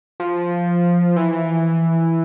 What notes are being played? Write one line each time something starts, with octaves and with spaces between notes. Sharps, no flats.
F3
E3